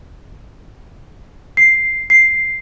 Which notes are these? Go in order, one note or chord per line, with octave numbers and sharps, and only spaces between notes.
C7
C7